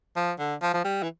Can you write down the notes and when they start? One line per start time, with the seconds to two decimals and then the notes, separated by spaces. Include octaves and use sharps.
0.16 F3
0.39 D3
0.62 F3
0.73 F3
0.84 G3
1.03 E3